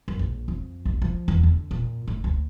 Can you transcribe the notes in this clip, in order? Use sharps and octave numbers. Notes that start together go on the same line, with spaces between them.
F#2
A#1
F2
B1
F3
E2
D3
A#2
A2
D2